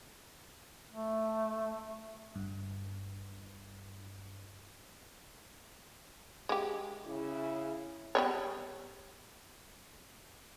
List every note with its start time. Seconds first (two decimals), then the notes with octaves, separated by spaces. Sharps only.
0.92 A3
2.35 G1 G2
6.49 G#3 G4
7.05 C#3 E4
8.15 G3 B3 C#5